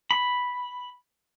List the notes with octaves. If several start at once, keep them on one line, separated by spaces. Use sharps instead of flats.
B5